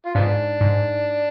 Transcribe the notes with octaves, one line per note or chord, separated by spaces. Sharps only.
F4
G#2 B3 D4
G#2